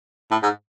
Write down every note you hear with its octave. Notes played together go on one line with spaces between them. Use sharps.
A2
G#2